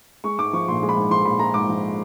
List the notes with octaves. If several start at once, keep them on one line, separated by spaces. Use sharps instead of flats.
G#3 C#6
G#2 D6
F3 C#6
A#1 C6
G#3
B5
G#2
F3 C6
A#1 B5
G#3 A#5
G#2 D6
F3